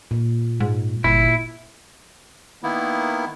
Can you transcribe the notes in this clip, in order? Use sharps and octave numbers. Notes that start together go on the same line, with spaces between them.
A#2
G#2
G1 A#2 E4
D#3 A#3 B3 E4